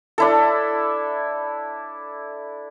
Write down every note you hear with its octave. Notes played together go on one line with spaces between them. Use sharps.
D4 E4 A4